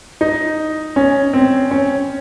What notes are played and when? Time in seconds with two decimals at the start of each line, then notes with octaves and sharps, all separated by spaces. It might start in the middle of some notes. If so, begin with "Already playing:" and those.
0.21 D#4
0.96 C#4
1.33 C4
1.71 C#4